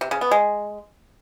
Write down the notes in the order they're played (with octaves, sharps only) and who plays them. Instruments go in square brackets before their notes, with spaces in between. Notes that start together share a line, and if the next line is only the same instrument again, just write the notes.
[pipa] C3
C#3
B3
G#3